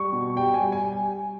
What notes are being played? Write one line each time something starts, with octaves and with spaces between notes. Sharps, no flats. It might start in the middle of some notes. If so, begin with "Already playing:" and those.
Already playing: G3 C#6
B2
G3 G5
G#5
G3
G#5